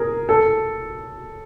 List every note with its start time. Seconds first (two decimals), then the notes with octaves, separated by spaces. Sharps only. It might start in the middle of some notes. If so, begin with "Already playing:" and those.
Already playing: G#4 A#4
0.29 A4